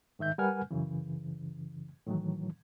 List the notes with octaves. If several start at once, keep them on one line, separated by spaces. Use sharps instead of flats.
G#2 D#3 E5 G6
G3 A#4 B4 F#5 G#5 F6
F#2 C#3 E3
A2 D#3 E3 F#3